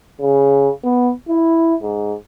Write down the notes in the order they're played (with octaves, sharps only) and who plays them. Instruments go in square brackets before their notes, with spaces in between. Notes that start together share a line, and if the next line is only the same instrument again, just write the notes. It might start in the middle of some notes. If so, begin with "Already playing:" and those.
[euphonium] C#3
B3
E4
G#2